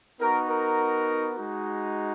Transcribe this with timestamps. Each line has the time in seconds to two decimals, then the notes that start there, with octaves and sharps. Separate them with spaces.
0.19 B3 D#4 F#4 A#4
0.49 A#4
1.35 G#3 D#4 F#4